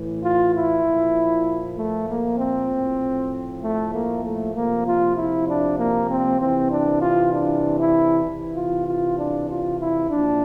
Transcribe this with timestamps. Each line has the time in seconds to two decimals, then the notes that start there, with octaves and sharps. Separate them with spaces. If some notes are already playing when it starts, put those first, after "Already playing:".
Already playing: A2 E3
0.23 F4
0.54 E4
0.85 A#2 F3
1.78 A3
2.09 A#3
2.38 C4
2.69 A2 F3
3.62 A3
3.93 A#3
4.24 A3
4.55 C3 F3 A#3
4.86 F4
5.16 E4
5.47 D4
5.78 A#3
6.09 C4
6.39 C3 E3 C4
6.71 D4
7.01 F4
7.33 D4
7.78 E4
8.24 C3 E3
8.55 F4
8.87 F4
9.18 D4
9.48 F4
9.79 E4
10.09 A#2 F3 D4